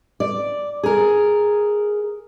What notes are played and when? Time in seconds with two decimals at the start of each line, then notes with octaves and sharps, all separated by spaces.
0.20 D5
0.83 G#4 A#4